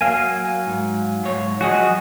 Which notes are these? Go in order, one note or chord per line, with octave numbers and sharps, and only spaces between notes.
F#3 A#3 F5 G#5
G#2
G#2 C#5
F3 F#3 F#4 G#4 D#5